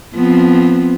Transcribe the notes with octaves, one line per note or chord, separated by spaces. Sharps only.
F3 B3 C4